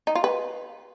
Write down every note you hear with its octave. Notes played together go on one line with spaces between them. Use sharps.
D#4
F4
B4